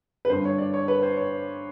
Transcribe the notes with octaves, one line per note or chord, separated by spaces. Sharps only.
B4
G2 D3 C5
C#5
D5
C#5
B4
C5
C#5